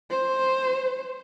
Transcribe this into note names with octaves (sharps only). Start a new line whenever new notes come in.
C5